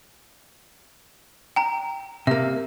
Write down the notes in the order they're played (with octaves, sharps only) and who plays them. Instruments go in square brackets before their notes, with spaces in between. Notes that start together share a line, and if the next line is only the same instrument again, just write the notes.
[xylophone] G5 A#5
[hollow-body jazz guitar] C3 A#3 [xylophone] E5